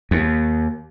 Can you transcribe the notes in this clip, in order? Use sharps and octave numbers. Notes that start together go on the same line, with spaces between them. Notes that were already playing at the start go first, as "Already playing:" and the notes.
D#2